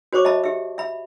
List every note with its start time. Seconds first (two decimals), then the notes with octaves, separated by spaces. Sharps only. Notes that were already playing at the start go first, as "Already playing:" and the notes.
0.13 F#4 C5 C#5 C#6 D6
0.25 D#5 E5 A5 B5
0.44 G4 E5
0.78 E5 B5